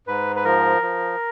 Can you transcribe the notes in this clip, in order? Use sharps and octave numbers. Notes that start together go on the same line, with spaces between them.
G#2 B4
B4
F3 A#4
F3